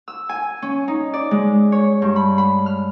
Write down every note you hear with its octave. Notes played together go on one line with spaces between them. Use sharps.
E6
G#5
C#4
D#4
D5
G#3
C#5
G2
B5
B5
F6